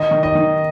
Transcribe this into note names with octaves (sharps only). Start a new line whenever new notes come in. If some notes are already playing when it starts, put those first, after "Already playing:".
Already playing: D#3 D#5
D#3
D#5
D#3